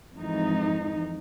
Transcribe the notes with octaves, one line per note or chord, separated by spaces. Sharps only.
F2 G#2 E3 D#4